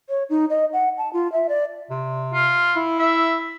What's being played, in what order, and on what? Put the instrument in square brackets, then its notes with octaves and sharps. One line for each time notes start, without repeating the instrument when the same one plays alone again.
[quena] C#5
D#4
D#5
F#5
A5
F4
E5
D5
[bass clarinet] C3
[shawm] F4
[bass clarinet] E4
[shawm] E5